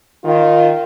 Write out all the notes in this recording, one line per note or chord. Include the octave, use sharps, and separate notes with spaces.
D#3 F4